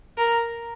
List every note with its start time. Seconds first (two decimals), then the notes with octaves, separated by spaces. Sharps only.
0.18 A#4